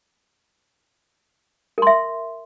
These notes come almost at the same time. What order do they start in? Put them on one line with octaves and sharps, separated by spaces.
A#4 C6 E5